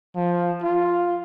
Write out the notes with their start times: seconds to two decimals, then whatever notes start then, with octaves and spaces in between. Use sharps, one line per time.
0.16 F3
0.64 F4